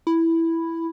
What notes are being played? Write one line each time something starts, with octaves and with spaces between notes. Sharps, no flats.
E4